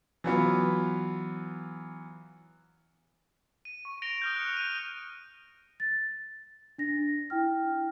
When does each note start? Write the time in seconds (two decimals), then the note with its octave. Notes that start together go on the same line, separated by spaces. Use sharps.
0.24 E3 F#3 B3 F4
3.65 D#7
3.85 C#6
4.02 A#6 D7 F7 G7
4.22 D#6 F6 G6
4.36 F#6 C#7
4.57 G6 D#7
5.80 A6
6.78 D4 A#6
7.30 E4 G5 F6